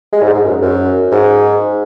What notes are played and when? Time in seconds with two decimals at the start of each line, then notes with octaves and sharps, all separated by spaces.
0.12 G#3
0.23 G#2
0.34 G#2
0.45 F#2
0.62 F#2
1.12 G#2